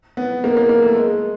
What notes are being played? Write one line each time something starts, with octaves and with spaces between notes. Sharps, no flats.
B3
A#3
A#3
A#3
A3
G#3